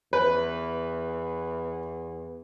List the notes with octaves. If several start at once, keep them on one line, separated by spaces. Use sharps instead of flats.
E2 B4